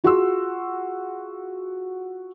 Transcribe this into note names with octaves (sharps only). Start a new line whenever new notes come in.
F4 F#4 G#4 F#5 C6 E6